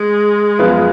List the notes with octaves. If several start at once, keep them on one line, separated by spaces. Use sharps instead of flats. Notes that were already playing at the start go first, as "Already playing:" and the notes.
Already playing: G#3
F#2 F3 B3 F4 B4